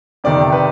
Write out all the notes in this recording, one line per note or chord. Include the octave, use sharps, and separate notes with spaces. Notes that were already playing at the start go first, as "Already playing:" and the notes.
F2 C3 D#3 D5
B4